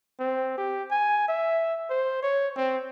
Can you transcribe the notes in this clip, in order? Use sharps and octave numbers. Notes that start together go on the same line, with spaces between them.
C4
G4
G#5
E5
C5
C#5
C4